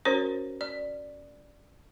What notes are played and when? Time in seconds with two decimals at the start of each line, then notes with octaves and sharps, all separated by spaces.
0.05 C#4 F#4 A#4 C5 C#5
0.61 D5